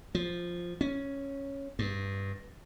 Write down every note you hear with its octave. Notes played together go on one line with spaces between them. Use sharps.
F3
C#4
G2